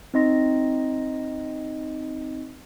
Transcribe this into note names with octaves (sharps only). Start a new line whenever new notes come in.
C4 D#4 D#5 C6 A#6